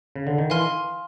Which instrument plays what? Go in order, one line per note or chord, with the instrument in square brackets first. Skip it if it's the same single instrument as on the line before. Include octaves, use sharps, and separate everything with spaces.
[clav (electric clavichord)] C#3
D3
D#3
[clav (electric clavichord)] E3 [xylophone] F5 G#5 C6 F6